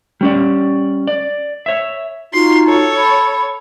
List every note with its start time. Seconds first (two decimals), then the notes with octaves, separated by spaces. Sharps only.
0.21 G3 C#4 D5
1.08 D5
1.66 C#5 E5
2.33 D#4 F4 F#4 C6
2.66 A4 C#5
2.97 B5